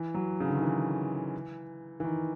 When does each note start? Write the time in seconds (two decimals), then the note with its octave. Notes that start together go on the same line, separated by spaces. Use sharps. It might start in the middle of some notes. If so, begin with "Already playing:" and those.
Already playing: E3
0.14 F#3
0.40 C#3
0.48 D3
0.55 D#3
0.62 E3
2.00 E3
2.04 D#3